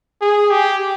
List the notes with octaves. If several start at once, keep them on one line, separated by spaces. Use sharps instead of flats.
G#4
G4